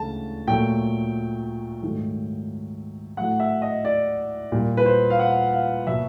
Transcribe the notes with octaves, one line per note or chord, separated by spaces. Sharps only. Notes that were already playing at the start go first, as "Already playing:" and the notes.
Already playing: D2 C#3 E3 G#3 A5
A#2 F#3 A3 G5
G#2 D#3 F#3 A3
A2 F#3 A3 F#5
E5
D#5
D5
A#2 G3 A#3
B4
C5
F5
F#5
F5
B2 F#3 A#3 E5